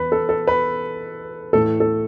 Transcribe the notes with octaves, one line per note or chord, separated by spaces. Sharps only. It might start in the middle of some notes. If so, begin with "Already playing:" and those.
Already playing: E2 B4
A4
A4
B4
A2 E3 A4
A4